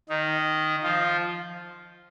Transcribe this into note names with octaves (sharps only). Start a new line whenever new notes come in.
D#3 D#4
F3 F4